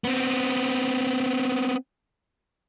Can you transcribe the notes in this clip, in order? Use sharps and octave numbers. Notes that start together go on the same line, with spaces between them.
B3 C4